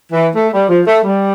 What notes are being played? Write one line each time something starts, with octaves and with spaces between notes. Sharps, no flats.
E3
A3
G3
F3
A3
G3